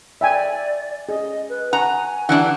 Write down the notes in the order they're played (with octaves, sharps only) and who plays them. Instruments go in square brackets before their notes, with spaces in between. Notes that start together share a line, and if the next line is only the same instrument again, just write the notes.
[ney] D5 [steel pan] E5 G5 G#5
[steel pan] G#4 [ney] D#5
[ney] B4
[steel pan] F#5 [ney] G#5 [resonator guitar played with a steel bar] A#5
[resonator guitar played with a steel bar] E3 G3 D4 [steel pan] F#5